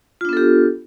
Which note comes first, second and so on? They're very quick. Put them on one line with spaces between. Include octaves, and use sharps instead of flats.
F4 D4 B3 A4 G4